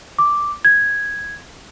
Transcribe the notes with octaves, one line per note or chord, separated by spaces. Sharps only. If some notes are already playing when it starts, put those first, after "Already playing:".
D6
G#6